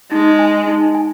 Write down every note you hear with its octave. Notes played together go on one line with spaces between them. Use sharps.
G#3 D#4
G#5
D#4
G#5